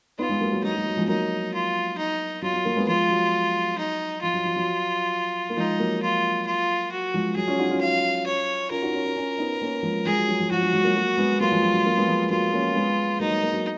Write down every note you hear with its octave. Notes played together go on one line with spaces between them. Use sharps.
B3 D#4 F4
G#3 B3
F#3 A#3
F#3 A#3
F#3 D#4
F#3
F#3
F3 G#3
F#3 A#3 D#4
F4
D#4
F#3 F4
F#3
F#3 A#3
G#3 B3
F3 G#3 F4
F#3
D#4
F3 F4
F#3
F3
F#3
A#3
F3 G#3 D#4
F#3 A#3
F4
F4
F#4
F3 G#3
F#3 G#4
C#4 F4
D#4 F#4
C#4 F4
F5
C#5
C#4 F4 A#4
D#4 F#4
C#4 F4
C#4 F4
C#4 F4
B3 D#4
A#3 C#4
F3 G#3
F3 G#3 G#4
F#3
F#3
F3
F3 F#4
F#3
F3 G#3
F#3 A#3
F#3 A#3
G#3 B3
F#3 A#3 F4
F3 G#3
F#3
F#3
F#3 A#3
G#3 B3
F3 G#3
F#3 A#3 F4
A#3 C#4
G#3 B3
F#3 A#3 D#4
F#3
F#3 A#3
F#3 A#3